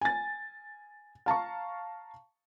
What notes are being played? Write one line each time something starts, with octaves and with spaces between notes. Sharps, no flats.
G#5 A6
F5 A5 A#5 C#6